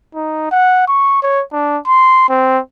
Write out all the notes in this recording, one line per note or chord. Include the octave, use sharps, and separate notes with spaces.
D#4
F#5
C#6
C#5
D4
C6
C4